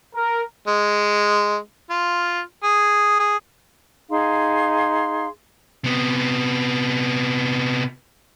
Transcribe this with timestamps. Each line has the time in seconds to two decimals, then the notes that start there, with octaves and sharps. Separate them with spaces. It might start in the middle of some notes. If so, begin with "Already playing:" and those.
0.15 A#4
0.68 G#3
1.90 F4
2.63 G#4
3.19 G#4
4.10 D#4 G#4 F5 C6
5.84 C3 B3